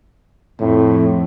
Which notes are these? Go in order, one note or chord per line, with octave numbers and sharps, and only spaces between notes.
F2 A2